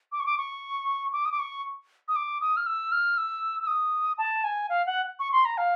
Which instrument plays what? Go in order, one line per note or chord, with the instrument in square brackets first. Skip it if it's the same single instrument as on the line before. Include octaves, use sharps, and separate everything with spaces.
[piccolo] D6
C#6
D6
C#6
D6
D#6
D6
C#6
D#6
D6
D#6
F6
E6
F6
E6
E6
D#6
A5
G#5
F5
F#5
C#6
C6
A#5
F5